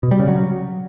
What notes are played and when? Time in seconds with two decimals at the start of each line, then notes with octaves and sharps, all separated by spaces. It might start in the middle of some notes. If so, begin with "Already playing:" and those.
0.03 B2
0.11 G3
0.20 C#3
0.28 F#3